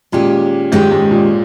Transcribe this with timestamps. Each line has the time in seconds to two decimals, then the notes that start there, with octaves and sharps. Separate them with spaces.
0.12 A#2 D#3 G#3 C#4 G4
0.72 G#2 D#3 G#3 C#4 G4
0.91 G#2
1.11 A#2